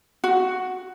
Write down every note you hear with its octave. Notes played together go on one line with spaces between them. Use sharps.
F#4